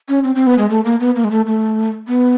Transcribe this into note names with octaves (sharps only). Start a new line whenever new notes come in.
C#4
C4
C4
B3
G#3
A3
A#3
B3
A#3
G#3
A3
A3
B3